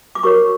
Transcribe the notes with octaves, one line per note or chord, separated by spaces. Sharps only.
D6
F#4 A#4 C#5 C#6